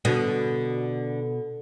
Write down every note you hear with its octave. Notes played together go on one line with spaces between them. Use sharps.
B2 D3